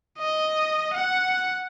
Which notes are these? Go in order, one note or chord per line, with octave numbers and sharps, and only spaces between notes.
D#5
F#5